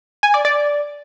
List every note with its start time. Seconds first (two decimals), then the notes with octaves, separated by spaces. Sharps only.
0.23 G#5
0.34 D5
0.45 D5